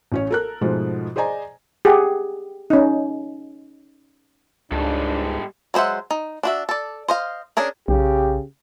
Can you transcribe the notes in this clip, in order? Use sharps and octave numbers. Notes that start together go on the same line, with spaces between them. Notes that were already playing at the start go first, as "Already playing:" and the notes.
A1 C#4 C#5
A4 A#4 F#6
G#2 B2 F3 G#3 A3
G#4 C5 D5 D#5 G#5 A#5
G4 G#4 F#5
C#4 D#4
C#2 G#2 G3 D4 A4
F#3 G#3 C5 E5 F#5
D#4
D4 F#4 E5
A4 D5
C5 D#5 F5
C#4 D4 G#4 A#4
B1 C#3 G4